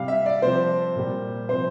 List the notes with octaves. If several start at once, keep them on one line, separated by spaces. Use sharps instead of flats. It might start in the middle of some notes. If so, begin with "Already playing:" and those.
Already playing: C3 G3 F5
E5
D5
C3 F3 C5
A#2 G3
C3 F3 C5